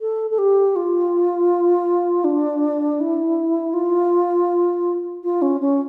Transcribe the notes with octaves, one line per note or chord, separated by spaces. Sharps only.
A4
A4
G4
F4
D4
E4
F4
F4
C#4
C#4